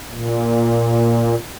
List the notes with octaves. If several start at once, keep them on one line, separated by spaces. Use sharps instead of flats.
A#2